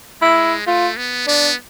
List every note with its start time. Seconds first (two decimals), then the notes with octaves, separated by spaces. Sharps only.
0.22 G#3 E4
0.67 A3 F4
0.97 B3
1.27 B3 D4